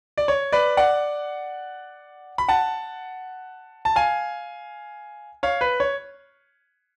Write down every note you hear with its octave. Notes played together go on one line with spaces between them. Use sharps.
D5
C#5
B4 D5
D5 F#5
B5
F#5 A5
A5
F5 G#5
C#5 F5
B4
C#5